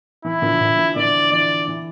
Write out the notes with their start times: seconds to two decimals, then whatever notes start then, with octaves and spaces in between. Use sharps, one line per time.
0.25 E3 E4
0.42 D3 F3
0.61 D3
0.78 E3
0.96 D3 F3 D5
1.32 E3 D5
1.68 E3